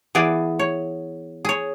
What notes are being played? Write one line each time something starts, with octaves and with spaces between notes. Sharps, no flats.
E3 B3 G#4 D5
C#5
G#4 C#5